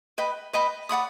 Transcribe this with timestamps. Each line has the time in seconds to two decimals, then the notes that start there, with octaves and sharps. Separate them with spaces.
0.18 B4 D#5 G5 B5
0.53 B4 D#5 G5 B5
0.89 D5 F#5 B5 D#6